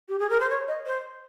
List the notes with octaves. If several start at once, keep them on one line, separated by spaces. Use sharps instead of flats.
G4
G#4
A#4
C5
C#5
D#5
C5